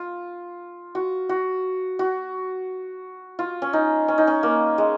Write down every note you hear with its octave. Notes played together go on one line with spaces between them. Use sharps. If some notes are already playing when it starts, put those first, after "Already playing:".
Already playing: F4
F#4
F#4
F#4
F4
C#4
D#4
C#4
D#4
C#4
A#3
G#3